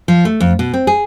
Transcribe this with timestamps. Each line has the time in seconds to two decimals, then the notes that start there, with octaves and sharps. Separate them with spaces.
0.08 F3
0.25 A3
0.40 F2
0.59 B2
0.74 C4
0.87 G#4